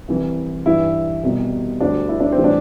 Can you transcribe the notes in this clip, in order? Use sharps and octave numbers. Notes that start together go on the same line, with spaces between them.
C2 C3 E3
G2 E3 G3 E4
C2 B2 G3
D2 D3 G3 D4
E4
D4
C4
A2 E3 G3
D4